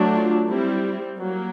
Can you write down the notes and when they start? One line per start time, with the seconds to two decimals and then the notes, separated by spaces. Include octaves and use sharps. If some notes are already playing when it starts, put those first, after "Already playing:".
Already playing: F#3 A3 D4
0.13 F4
0.48 G3 C4 E4
1.19 F#3 A#3